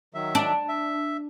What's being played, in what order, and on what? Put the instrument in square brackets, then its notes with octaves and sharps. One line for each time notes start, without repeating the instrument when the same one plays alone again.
[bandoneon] D#3 F#3 E5
[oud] D4
[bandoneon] E5